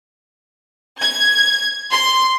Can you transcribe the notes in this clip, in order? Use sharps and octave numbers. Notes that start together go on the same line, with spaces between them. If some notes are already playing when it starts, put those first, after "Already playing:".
G#6
C6